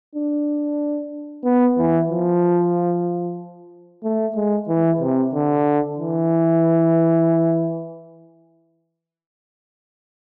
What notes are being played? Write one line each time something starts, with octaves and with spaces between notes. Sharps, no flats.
D4
B3
E3
F3
A3
G#3
E3
C3
D3
E3